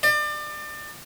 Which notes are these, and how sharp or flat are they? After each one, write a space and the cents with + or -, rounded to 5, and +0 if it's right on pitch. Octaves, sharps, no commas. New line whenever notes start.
D5 +35